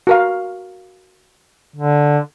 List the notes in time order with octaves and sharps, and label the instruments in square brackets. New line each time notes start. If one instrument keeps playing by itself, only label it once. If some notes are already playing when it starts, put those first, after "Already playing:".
[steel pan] F#4 A#4 F5
[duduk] D3